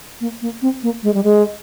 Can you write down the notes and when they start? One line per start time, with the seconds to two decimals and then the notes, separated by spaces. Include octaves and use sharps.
0.21 A#3
0.42 A#3
0.62 C4
0.83 A#3
1.03 G#3
1.14 G3
1.24 G#3